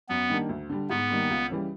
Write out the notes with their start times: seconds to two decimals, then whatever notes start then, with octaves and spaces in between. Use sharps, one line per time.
0.09 F#2 B3
0.29 D#3 G3 A#3 D4
0.49 D2
0.69 D3 G3
0.90 G#2 B3
1.10 D#3 G3 A#3
1.30 C#2
1.50 C#3 E3 G3